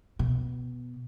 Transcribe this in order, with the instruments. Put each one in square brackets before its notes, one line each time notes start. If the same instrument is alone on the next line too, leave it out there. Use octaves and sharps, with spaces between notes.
[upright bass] B2